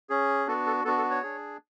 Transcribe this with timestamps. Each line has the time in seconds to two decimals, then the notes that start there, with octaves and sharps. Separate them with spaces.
0.10 C#4 G#4
0.47 B3 D4 F#4 A4
0.66 A4
0.85 B3 D4 F#4 A4
0.98 A4
1.10 C#5
1.23 D4 G#4